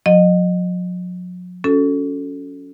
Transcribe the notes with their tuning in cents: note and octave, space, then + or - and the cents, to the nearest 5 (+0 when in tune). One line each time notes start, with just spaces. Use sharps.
F#3 -45 D#5 -20
C#4 +20 F#4 -20 A4 +0